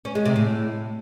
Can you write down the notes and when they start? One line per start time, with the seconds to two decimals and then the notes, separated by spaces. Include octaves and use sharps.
0.05 C#4
0.15 G#3
0.25 C3
0.36 A2